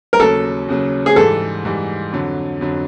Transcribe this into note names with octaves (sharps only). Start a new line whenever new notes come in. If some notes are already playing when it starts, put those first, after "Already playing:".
A#4
D#2 C#3 F#3 A4
D#2 C#3 F#3
G#4
G#2 E3 G3 A4
G#2 E3 G3
F2 D3 F#3
F2 D3 F#3